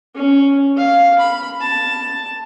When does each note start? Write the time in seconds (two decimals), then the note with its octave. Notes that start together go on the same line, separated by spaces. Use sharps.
0.15 C#4
0.77 F5
1.19 B5
1.61 A5